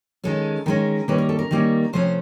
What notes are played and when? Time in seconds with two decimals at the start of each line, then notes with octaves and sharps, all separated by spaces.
0.24 D#3 G#3 C#4 A4
0.66 D#3 G#3 C#4 A#4
1.08 D#3 G3 A#3 C#4 B4
1.18 A#4
1.29 A4
1.39 A#4
1.51 D#3 G3 A#3 C#4
1.93 C3 F3 A3 C#4 C5